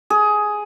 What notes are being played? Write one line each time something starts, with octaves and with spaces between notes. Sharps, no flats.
G#4